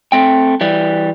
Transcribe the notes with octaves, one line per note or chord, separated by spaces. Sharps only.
A3 C4 G5
E3 G3